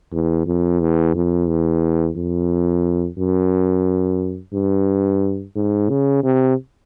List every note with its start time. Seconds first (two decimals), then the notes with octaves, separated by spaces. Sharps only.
0.13 E2
0.47 F2
0.81 E2
1.15 F2
1.49 E2
2.17 F2
3.18 F#2
4.54 G2
5.56 G#2
5.90 C#3
6.24 C3